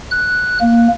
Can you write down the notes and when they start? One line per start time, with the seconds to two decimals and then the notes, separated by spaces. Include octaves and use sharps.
0.11 F#6
0.61 A#3